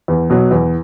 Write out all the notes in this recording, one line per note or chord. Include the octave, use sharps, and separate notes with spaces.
E2
B2 F#3
E2